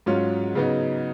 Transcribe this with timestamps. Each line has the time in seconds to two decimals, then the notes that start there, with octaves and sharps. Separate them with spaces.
0.06 G#2 F#3 C#4 F4
0.55 C#3 F#3 B3 D#4